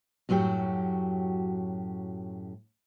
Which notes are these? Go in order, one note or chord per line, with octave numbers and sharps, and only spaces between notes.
F#2 A2 F#3 F#4 G4